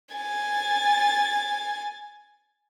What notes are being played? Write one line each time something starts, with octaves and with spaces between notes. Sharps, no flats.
G#5 A6